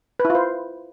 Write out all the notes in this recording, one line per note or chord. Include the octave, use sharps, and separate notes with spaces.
B4
E4
F4
C5